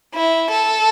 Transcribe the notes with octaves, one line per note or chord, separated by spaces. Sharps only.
E4
A4